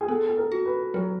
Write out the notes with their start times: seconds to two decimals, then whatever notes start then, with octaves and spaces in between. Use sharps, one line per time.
0.01 G#4
0.08 B3 A4
0.27 A4
0.38 A#4
0.52 F#4
0.66 B4
0.94 F#3 A#4